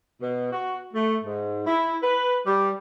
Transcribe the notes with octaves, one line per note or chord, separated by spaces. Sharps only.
B2
F#4
A3
G#2
E4
B4
G3